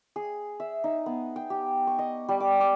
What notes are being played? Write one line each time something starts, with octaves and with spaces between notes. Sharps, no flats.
G#4
E5
D#4
B3
G5
G4
C#6
D#5
G3
D6
D6